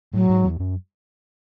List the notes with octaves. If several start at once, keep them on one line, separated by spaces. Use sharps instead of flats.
A2 F#3
G#2
E2
F#2